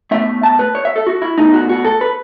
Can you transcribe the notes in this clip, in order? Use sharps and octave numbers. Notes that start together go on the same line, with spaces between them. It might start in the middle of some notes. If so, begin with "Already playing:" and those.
B2 A3 E5
A5
B4
C#5
E5
A4
F#4
E4
B2 A3 D#4
F#4
F#4
A4
B4